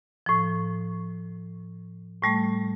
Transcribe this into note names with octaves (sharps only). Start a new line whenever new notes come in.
A2 F3
A2 G3 A3